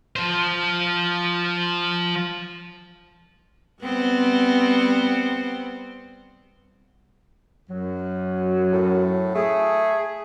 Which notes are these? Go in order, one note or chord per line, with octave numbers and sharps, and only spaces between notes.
F3 C5
G3 B3 C4
F#2 F#3
A2
A3 G#4